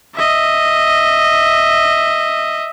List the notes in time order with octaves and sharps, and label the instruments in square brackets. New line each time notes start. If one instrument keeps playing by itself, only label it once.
[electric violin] D#5 E5